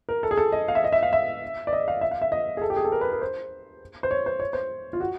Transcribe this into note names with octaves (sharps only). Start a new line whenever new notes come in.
A#4
A4
G#4
A4
D#5
F5
E5
D#5
E5
F5
E5
D5
D#5
F5
E5
F5
E5
D#5
G#4
A4
G4
G#4
A4
A#4
B4
A#4
C5
C5
C#5
C5
C#5
C5
F4
F#4